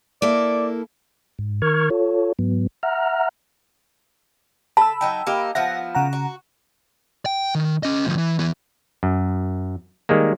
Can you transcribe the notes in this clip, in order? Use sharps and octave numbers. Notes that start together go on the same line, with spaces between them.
A#3 E4 A4 D5
G#2
D#3 A#4 C#6 F6 G#6
F4 A4 C#5
G#2 F#3 B3
E5 F#5 A#5 F6
A4 A5 B5 E6
F#3 D#4 G5
A#3 D#4 G4
F3 B3 E4 E5 F#5 A#6
C#3 F#5 A#5
F#4
G5
D#3
C#4 D#5
D2 F3
E3
E3 B3
F#2
D#3 G3 G#3 A#3